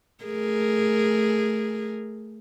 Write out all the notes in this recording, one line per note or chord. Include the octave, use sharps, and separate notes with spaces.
A3 G#4 A#4